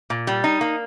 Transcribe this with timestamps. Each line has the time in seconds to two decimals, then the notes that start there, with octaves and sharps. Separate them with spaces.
0.10 A#2
0.27 G3
0.44 D#4
0.61 A#3